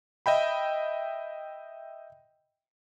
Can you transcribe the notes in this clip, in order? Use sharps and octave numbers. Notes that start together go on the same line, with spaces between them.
D#5 E5 G5 B5